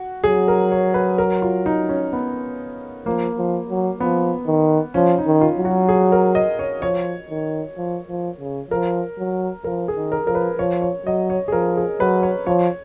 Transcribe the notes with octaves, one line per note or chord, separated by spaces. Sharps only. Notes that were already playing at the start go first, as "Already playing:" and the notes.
Already playing: F#4
F#3 G#4
A#4
C#5
B4
A#4
F4
D#4
C#4
B3
F3 A#3
F3
F#3
F3 B3
D#3
F3 C#4
D#4
D#3
F4
F#3
F#4
G#4
A#4
D#5
C#5
F3 C#5
D#3
F3
F3
C#3
F3 A#4
F#3
F3 A#4
G#4
D#3
A#4
F3 A#4
B4
F3 C#5
C#5
F#3 D#5
C#5
G#4
F3 A#4
G#4
F#3 B4
C#5
F3 C#5